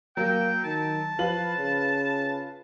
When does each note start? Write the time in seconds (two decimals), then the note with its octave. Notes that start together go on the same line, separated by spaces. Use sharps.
0.17 F#3 A#3 G5
0.64 D#3 A5
1.19 F3 F4 B4 F#7
1.57 C#3